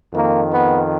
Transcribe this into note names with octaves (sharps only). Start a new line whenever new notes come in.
F2 D#3 A#3
B3